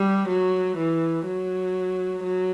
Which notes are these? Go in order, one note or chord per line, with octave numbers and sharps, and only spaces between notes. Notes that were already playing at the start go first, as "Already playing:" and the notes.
Already playing: G3
F#3
E3
F#3
F#3